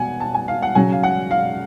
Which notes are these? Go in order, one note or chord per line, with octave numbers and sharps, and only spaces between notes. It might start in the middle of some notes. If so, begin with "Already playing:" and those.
Already playing: B2 F#5 G#5
A5
G#5
F5
F#5
C#3 F#3 G#5
F5
F#5
F5